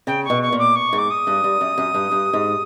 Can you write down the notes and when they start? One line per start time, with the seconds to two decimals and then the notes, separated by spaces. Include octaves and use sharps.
0.07 C#3 G5
0.25 C#6
0.30 B2
0.42 C#6
0.52 A#2
0.58 D6
0.75 C#6
0.93 G#2
0.98 D6
1.10 D#6
1.27 G2
1.44 G2
1.61 F#2
1.78 F#2
1.94 G2
2.11 G2
2.33 G#2